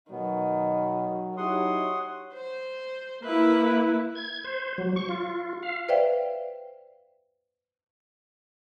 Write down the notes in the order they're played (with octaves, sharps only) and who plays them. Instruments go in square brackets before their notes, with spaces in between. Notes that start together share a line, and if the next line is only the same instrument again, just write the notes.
[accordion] B2 B3 [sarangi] D#3 [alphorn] F#3
[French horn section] D#4 E4 G4 [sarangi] C#5 [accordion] F#5 C6 D#6
[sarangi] C5
[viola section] A#3 E4 [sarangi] B4
[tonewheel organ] G#6
C5
F#3
C#6
F4
F5
[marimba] B4 C5 D5 E5 F5 G5